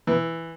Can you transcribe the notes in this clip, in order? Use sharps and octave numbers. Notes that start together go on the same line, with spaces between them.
E3